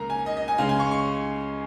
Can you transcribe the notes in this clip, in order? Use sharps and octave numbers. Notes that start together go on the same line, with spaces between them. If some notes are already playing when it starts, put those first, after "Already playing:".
Already playing: C#2 C#3 A#3 A#5
G#5
D#5
D#5
G#5
C#2 C#3 G#3 F5
G#5
C#6
C#6